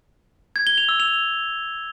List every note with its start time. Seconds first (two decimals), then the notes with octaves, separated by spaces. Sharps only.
0.56 G#6
0.67 G7
0.78 F7
0.89 E6
1.00 F7